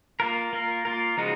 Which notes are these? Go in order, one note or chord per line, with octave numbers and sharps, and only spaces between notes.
A#3 F4 A#4
A#3 F4 A#4
A#3 F4 A#4
C#3 F3 G#3 D#4 F#4